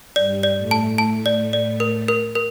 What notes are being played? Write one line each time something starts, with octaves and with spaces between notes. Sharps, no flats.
G2 G3 D5
D5
A2 A3
A5
A5
D5
D5
A#4
A#4
A#4